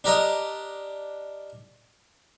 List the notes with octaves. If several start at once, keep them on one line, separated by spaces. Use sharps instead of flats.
D4 G4 A#4 D#5